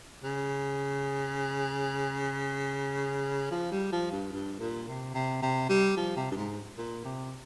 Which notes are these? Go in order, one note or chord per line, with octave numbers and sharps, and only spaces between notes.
C#3
F3
G3
F3
G2
G2
A#2
C3
C3
C3
G3
F3
C3
G2
G#2
A#2
C3